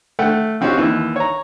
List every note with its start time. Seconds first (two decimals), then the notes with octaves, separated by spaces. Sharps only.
0.19 A3 F#5 G5
0.61 F3 C4 C#4 D#4 F#4 G4
0.77 D#2 E3
1.16 C#5 A#5